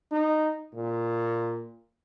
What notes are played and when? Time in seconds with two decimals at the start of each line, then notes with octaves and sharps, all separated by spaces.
0.11 D#4
0.75 A#2